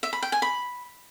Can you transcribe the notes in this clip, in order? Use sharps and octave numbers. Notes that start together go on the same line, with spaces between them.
E5
B5
G5
G#5
B5